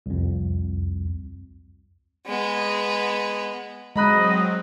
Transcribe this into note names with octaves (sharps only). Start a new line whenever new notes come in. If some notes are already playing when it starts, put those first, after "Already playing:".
C2 F2
G#3 B3
F#3 G#3 C4 D#5 A#5 B5 F#6